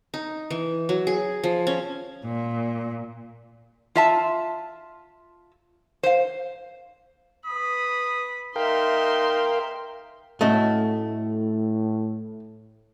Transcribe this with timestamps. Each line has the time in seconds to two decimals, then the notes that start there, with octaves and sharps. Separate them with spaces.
0.14 D#4
0.50 E3
0.89 F#3
1.07 G#4
1.44 F3
1.67 C#4
2.23 A#2
3.95 F4 E5 A5
6.03 C5 F5
7.46 B4 B5 D#6
8.56 D#4 A#4 E5 F5 G5 C6
10.41 A2 A3 C#4 F#4 D#5